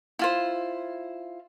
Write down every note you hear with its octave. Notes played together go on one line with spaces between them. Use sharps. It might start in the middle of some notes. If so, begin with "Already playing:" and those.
E4 F4 C5